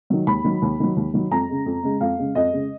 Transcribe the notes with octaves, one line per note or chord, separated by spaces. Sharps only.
D#3 F#3
D#2 B5
D#3 F#3
D#2
D#3 F#3
D#2
D#3 F#3
F2 A#5
C#3 G#3
F2
C#3 G#3
F2 F5
C#3 G#3
F2 D#5
C#3 G#3